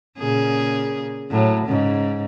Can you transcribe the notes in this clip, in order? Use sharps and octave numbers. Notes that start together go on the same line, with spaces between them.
A#2 C#3 G#4
A2 F#3
G#2 C#3